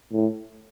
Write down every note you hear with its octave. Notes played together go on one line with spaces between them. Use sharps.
A2